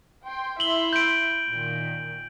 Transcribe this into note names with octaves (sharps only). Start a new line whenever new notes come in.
G5 C6
E4 E5 C6 F#7 G7
G6 D7
A#2 D#3